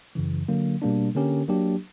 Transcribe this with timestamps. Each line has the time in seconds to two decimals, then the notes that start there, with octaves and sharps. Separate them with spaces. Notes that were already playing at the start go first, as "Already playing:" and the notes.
0.15 F#2 C#3 E3
0.49 D3 F#3 A#3
0.82 B2 G3 A#3 D4
1.15 D3 A#3 C#4 G4 A#4
1.48 F#3 A#3 D4 G4